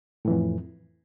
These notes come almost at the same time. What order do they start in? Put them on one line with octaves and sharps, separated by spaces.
A2 E3 F2